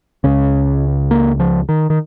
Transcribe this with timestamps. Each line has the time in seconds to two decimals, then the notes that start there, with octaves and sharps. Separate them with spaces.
0.24 C#2 C#3 C#4
1.11 A#3
1.40 F3
1.69 D#3
1.90 D#3